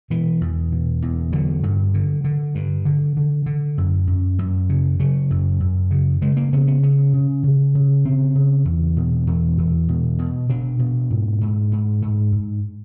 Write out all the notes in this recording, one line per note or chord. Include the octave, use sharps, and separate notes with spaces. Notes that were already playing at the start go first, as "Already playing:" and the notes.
B2 E3
E2
B2
E2
D3 F#3
G2
D3
D3
G2
D3
D3
D3
F#2
F#2
F#2
C#3
C#3 F#3
F#2
F#2
C#3
C#3 G#3
A#3
C#3 B3
B3
C#3 C#4
C#3
C#3
C#3
C#3 C4
C#3
E2
B2
E2
E2
B2
B2
B2 D4
B2
G#2
G#2
G#2
G#2
G#2